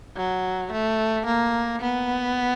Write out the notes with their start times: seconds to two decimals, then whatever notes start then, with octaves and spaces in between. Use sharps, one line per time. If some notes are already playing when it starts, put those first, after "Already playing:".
0.17 F#3
0.72 A3
1.26 A#3
1.82 B3